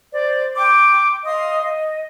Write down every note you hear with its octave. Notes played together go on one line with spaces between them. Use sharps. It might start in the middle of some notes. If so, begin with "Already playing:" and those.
C5 D5
G5 C6 D6
D#5 F5 C6 D#6
D#5